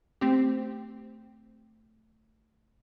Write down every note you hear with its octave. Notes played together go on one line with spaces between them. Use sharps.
A3 C4 G4